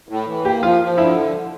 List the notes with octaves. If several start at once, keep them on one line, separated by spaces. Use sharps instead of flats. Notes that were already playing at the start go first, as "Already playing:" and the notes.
A2
E3
A#3 G4
F3 F4
F3
D3 E4